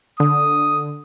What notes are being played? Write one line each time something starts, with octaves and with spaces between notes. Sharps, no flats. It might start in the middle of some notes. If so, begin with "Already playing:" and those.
D3 D#6